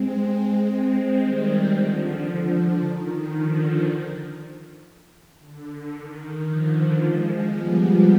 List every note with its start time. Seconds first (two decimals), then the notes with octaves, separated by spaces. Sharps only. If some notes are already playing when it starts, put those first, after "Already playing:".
Already playing: G#3 C4
1.20 D#3 G3
1.72 D3 F3
2.25 D3 F3
2.77 D#3
3.29 D3 F3
5.40 D3
5.92 D#3
6.44 D3 F3
6.97 F3 G#3
7.49 G3 B3